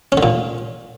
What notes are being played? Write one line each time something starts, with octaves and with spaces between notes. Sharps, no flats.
C#4
D3
A#2